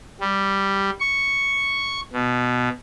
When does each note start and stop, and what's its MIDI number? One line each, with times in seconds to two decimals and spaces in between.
0.21 0.90 55
1.00 2.00 85
2.13 2.69 47